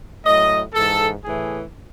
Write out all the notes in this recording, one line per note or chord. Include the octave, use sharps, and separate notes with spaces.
A2 F#3 D#5
G#2 E3 A4
A2 E3 G#4